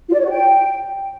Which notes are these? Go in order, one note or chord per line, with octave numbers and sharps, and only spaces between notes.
F4
D5
C#5
F#4
G5